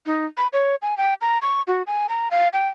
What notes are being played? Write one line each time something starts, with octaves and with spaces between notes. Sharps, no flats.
D#4
B5
C#5
G#5
G5
A#5
C#6
F#4
G#5
A#5
F5
G5